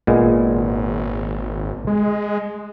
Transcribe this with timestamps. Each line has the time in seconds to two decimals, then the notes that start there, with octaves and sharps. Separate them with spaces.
0.07 G#1 A#2 G#3 B3
1.87 G#3